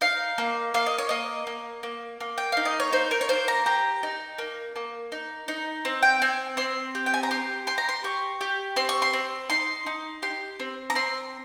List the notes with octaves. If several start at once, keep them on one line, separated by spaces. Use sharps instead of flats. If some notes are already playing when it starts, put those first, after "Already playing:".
D#4 F5
A#3
A#3 F5
D#5
C#5
A#3 D#5
A#3
A#3
A#3
G5
D#4 F5
D#5
C#5
D#4 C5
A#4
C#5
A#3 C5
A#5
G4 A#5
D#4
A#3
A#3
D#4
D#4
C4
G5
C4 G#5
C4 C6
G4
G5
G#5
A#5
G4 C6
G4 C6
A#5
C6
G4 C#6
G4
C4 C6
C#6
C6
C4
D#4 C6
D#4
G4 C6
C4
A#5
C4 C6